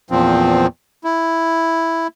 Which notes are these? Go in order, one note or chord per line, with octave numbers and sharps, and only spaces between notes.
E2 A#2 F3 C4
E4